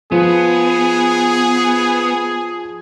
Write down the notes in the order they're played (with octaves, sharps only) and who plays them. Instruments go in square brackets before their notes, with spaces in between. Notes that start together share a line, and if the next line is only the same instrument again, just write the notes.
[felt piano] F3 [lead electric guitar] B3 [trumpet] G#4